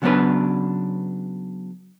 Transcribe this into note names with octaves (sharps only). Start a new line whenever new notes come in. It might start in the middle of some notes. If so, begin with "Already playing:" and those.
C#3 F#3 B3 C#4 D4 B4